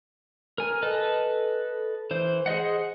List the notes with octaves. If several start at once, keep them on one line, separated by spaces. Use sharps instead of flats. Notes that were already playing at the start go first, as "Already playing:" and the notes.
A#4 G#5
A4 B4 D#5
E3 C5
G#4 C5 D#5 F#5